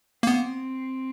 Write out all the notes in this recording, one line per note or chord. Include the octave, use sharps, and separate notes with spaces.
A#3
B3 C4